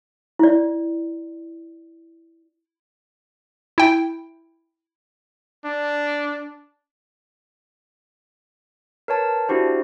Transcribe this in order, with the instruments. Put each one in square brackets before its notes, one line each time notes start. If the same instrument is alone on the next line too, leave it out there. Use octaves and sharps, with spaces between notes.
[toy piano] E4 D5
[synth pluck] E4 G5
[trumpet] D4
[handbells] A#4 B4 C#5 A5
D4 E4 F#4 G4 C5